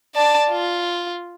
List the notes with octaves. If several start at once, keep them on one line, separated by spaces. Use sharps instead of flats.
D5 A5
F4